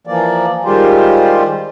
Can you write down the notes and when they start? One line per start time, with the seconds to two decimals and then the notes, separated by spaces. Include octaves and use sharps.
0.07 E3 F3 A#3 D5
0.65 D#3 G3 G#3 F4 G4 C5